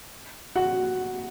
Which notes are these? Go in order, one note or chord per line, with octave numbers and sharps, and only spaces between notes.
F#4 F#5